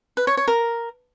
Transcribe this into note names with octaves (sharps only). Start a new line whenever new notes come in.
B4
C#5
C#5
A#4